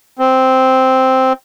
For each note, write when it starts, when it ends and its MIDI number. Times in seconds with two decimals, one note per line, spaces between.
0.19 1.33 60